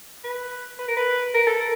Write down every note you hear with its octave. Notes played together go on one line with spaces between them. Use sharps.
B4
B4
A#4
B4
A#4
A4
A#4